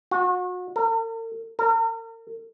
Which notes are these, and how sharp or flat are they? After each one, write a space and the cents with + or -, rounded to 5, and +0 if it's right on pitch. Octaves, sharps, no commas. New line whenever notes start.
F#4 -35
A#4 -45
A#4 -40